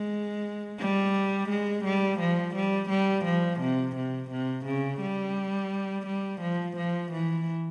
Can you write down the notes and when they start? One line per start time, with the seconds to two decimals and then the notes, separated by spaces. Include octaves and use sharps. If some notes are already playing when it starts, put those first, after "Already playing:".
Already playing: G#3
0.79 G3
1.49 G#3
1.84 G3
2.20 F3
2.55 G3
2.89 G3
3.25 F3
3.60 C3
3.96 C3
4.31 C3
4.66 C#3
5.01 G3
6.06 G3
6.41 F3
6.77 F3
7.12 E3